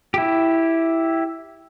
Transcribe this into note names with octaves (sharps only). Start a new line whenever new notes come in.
E4 G4